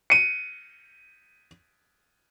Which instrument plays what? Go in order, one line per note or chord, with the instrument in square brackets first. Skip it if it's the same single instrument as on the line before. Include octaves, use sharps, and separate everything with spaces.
[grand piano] C#7 D#7